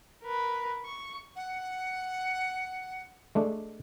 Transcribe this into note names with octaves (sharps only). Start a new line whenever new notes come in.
A#4 B4
C#6
F#5
G#3 A3 D4